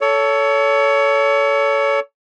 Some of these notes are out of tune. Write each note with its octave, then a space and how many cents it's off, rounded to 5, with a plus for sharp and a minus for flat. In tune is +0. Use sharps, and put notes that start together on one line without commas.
A4 +0 C#5 +25